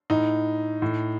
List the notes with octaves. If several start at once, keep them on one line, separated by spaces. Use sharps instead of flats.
A2 D#4
A2